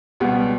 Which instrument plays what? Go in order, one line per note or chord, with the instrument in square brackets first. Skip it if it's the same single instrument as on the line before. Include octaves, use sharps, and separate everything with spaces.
[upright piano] C#2 B2 G3 B3